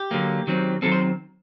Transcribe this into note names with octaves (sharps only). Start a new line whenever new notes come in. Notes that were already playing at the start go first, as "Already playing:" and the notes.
Already playing: G4
D3 F#3 A#3
D#3 F#3 C4
D#3 F#3 C4 A4
C5